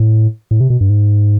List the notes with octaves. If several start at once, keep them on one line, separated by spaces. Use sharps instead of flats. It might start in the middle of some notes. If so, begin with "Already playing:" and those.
Already playing: A2
A2
C3
B2
G2
G#2